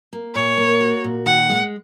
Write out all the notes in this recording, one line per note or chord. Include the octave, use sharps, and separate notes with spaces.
A#3
A#2 C#5
A#3
F#4
A#2
D#3 F#5
G#3